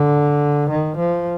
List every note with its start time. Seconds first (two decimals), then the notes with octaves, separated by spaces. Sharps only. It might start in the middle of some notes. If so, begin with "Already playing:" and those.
Already playing: D3
0.70 D#3
0.97 F3